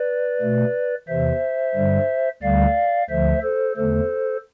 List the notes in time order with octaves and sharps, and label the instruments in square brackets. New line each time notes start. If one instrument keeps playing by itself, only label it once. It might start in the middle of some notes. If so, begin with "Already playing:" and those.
Already playing: [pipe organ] B4 D5
B2 A3
E2 C3 E3 C5 E5
G2 D3 G3
D2 D3 G3 D5 F5
D2 D3 F3 C5 E5
A4 C5
E2 D3 A3 A4 C5